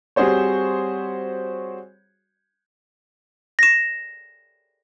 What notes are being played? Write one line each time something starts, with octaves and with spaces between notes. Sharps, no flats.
G3 C4 F#4 G#4 C5 C#5
A#6 E7